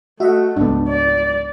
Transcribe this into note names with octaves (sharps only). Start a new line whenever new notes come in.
A3 F#4 D#5 E5 F#5
C#2 G#2 B3 D4
D5